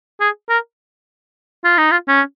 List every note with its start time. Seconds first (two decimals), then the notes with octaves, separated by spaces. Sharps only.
0.20 G#4
0.49 A#4
1.65 F4
1.78 D#4
1.91 F4
2.08 C#4